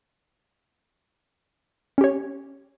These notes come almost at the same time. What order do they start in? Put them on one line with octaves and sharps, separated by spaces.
C#4 G4 C#5